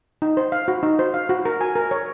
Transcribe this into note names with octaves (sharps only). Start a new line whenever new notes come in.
D#4
C5
F5
F#4
D#4
C5
F5
F#4
A#4
G#5
A#4
C#5